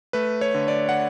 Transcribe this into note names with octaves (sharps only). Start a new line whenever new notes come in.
A3 B4
C#5
D3
D5
F#5